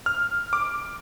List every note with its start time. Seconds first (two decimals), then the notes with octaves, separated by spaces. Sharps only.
0.06 F6
0.53 D6